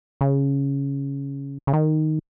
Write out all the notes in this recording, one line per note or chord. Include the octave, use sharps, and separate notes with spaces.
C#3
C#3
D#3